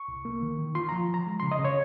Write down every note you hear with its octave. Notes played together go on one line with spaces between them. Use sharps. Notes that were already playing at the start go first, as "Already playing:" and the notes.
Already playing: C#6
C2
A#3
D#3
D#3
F4 C6
F3 A#5
F3
A#5
G#3
C#3 C6
D#5
C#3 C#5